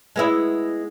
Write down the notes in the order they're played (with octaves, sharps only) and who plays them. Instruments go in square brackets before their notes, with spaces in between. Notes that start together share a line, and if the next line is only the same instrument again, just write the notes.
[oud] G#3 B3 E4